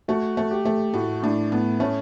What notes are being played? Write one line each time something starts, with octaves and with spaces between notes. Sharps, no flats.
A3 F#4
A3
G4
A3
A2 F#4
A2 D4
A2 B3
A3 C#4